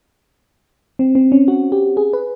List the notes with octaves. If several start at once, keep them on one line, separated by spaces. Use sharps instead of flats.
C4
C4
C#4
F#4
G4
G#4
B4